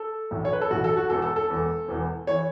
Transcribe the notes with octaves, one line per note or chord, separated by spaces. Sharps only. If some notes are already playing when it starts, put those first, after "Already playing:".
Already playing: A4
B1 A2 E3
C#5
B4
A4
B1 A2 E3 F#4
A4
F#4
E1 E2 E3 A4
A4
A4
E1 E2 E3
E1 E2 E3
E3 C#5